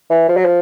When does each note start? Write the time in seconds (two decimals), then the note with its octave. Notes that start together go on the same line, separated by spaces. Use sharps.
0.10 E3
0.29 F3
0.37 F#3
0.46 F3